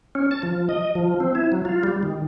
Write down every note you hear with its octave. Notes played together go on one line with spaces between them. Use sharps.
C#4
A5
F3
D#5
F3
C4
E4
F#3
F4
G3
D#3